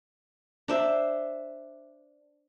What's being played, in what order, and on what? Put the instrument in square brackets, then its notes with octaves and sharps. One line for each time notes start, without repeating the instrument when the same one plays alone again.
[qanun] D4 C5 E5